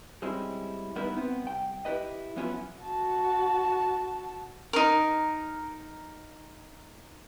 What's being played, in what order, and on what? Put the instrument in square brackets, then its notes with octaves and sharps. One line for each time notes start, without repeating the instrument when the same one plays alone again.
[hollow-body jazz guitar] G3 G#3 C4 C#4 E4
G3 B3 D#4 E4 A#4 B4
B3 C4
C2 G5
E4 G4 B4 D#5
F3 F#3 B3 C#4 E4 F4
[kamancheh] F#4 A5
[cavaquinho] D#4 A#4